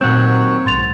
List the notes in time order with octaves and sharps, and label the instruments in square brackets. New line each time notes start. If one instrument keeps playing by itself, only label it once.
[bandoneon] D#2 F#3 C#5 [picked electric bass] A#2 A3 [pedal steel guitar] C4 F#5 [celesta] G6
[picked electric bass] B1 G#2 [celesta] C6 A6 F7